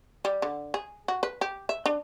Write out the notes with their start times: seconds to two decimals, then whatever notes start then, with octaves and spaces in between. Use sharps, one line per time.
0.25 G3
0.42 D3
0.74 G#4
1.08 F#4
1.23 B4
1.41 G4
1.69 E5
1.86 D4